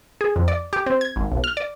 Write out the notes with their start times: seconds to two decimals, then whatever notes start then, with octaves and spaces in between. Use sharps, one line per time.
0.21 G#4
0.36 F2
0.48 D5
0.73 G4
0.86 C4
1.01 G#6
1.16 G#1
1.32 B1
1.44 F6
1.57 D5